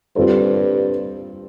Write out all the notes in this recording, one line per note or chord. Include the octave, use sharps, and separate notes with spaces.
G2 G3 C4 F4 A4 C5